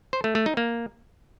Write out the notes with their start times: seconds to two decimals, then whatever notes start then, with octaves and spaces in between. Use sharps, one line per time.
0.13 C5
0.24 A3
0.35 A3
0.46 D#4
0.57 A#3